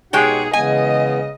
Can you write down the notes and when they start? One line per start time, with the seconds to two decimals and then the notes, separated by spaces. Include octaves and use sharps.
0.13 B2 G#3 D#4 G4 G#4 C#5 F#5 G5
0.53 C#3 E3 G#3 B3 D#5 G#5